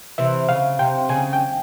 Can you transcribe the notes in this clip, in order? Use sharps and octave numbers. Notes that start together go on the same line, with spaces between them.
C3 E3 E5
C#3 F5
C3 G5
C#3 G#5
G5